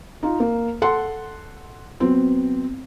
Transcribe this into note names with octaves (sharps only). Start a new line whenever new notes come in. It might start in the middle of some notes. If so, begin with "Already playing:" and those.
D#4 F4
A#3
A4 F#5 C6
F#3 B3 C4